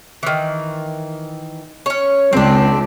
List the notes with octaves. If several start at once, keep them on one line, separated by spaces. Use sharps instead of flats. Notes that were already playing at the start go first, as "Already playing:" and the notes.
D#3 E3
C#4 C#5
C#2 C4 D4